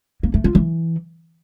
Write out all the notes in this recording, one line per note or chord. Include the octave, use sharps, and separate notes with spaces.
A#3
A3
F4
E3